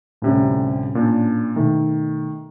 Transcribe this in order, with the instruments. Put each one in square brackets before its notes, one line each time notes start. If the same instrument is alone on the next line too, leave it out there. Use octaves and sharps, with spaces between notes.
[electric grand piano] D2 C3 G3 [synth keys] A2 C#4
[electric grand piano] A#2 D4
[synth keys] B2 A3 [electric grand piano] D#3